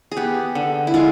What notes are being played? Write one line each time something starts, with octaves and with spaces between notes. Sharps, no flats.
G#4
B3 G4
D3
E4
G#3 F4